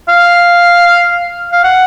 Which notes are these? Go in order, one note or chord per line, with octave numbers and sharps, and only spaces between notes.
F5
F5
F#5